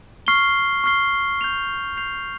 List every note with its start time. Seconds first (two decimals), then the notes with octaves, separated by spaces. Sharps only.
0.27 C#6 F6 C7 G7
0.84 C#6 F6 C7 G7
1.41 G6 C7 F7
1.97 G6 C7 F7